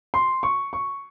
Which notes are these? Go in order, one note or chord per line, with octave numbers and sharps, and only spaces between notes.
C6
C#6
C#6